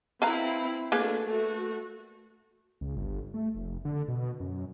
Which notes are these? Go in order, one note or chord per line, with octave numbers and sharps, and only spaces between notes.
C4 E4 B4 F5 A#5
A3 A#3 D4 F#4 G#4 B4
A3 F#4
C#2
G1
A3
F1
D3
B2
F#2